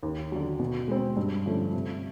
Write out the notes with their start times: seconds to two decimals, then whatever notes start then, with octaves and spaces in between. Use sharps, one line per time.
0.03 D#2
0.32 D3 F#3
0.59 B2
0.88 G#3 C4
1.16 G2
1.46 D3 F3 A3 C#4
1.73 C3